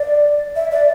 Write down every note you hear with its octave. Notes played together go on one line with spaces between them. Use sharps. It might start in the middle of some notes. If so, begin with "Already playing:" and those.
Already playing: D5
E5
D5